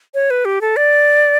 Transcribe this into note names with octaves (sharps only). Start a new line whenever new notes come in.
C#5
B4
G4
A4
D5